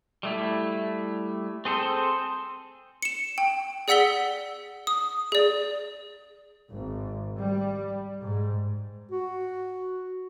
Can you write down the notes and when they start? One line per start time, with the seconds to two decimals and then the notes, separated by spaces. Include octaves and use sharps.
0.23 G3 A3 E4
1.65 C4 G#4 A4 C5
3.03 C#7 E7
3.38 G5
3.88 G#4 D5 F#5 E6 B6 G7
4.87 D#6
5.32 G#4 D5
6.69 G#1
7.38 G3
8.22 G#2
9.11 F#4